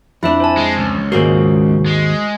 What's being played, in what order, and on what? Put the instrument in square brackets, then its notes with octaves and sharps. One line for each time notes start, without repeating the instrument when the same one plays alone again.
[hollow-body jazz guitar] F2 D4 [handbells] E4 E5
[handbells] C5 G#5 A5
[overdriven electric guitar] G#3
C#2
[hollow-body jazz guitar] D#2 G#2 A#3 [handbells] F#4 G#4 C5
[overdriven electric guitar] G#3